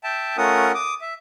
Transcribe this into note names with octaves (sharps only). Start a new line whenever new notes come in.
E5 G5 A5
A3 C#4 F4 A#4 F#5 D#6
D6 D#6
E5